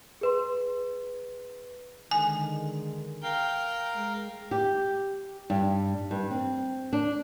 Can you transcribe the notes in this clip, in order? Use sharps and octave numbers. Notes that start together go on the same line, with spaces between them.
G#4 B4 C6
D3 D#3 G#3 G#5
A#4 F5 G5
G#3
G4
G2
G2
C4
D4